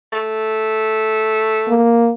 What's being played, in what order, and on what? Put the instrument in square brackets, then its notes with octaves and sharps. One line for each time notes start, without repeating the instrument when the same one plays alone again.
[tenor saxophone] A3
[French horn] A#3